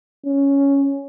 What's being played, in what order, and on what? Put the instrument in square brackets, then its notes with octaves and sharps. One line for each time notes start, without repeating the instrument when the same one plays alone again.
[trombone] C#4